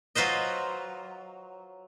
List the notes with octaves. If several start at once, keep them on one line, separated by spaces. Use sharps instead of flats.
F#3 F4 B4 C5 D#5